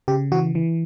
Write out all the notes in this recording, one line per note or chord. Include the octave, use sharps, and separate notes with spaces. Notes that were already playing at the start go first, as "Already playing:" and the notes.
C#3 G4
E3 F#4
E3